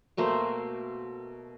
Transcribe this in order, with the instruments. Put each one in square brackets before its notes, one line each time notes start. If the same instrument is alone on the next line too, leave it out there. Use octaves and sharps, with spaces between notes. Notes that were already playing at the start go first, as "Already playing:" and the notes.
[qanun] B2 A3 A#3 C5